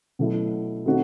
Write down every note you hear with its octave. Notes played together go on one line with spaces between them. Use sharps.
B2 F#3 A3 E4
D#3 A3 C4 F#4